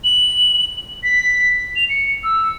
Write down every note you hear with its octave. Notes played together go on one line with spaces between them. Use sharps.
F#7
B6
F7
C#7
E6